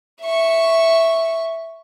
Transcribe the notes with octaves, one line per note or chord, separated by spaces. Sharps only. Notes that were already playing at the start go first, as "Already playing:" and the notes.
E5 C#6